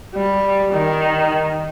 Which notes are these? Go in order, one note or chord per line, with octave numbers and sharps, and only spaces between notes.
G3
D#3